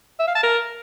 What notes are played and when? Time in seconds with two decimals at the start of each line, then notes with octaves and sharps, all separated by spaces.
0.20 E5
0.27 F5
0.35 A5
0.43 A#4